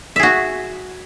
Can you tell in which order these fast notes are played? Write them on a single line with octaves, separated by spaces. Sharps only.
E5 G#4 F#4